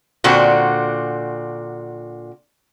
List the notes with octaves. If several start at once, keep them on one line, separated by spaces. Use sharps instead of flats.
A#2 D3 C4 F#4